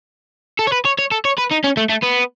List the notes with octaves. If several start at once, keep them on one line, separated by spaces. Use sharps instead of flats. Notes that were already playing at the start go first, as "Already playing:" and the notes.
A4
C#5
B4
C#5
C#5
A4
C#5
B4
D#4
C#4
A3
A3
B3